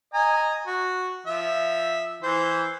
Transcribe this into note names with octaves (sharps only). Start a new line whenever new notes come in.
D#5 G#5 A#5
F#4
F3 E5
E3 C5